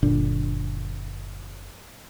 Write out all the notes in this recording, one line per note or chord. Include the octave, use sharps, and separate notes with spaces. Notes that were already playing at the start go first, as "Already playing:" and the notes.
F#1 A#2 D3 D4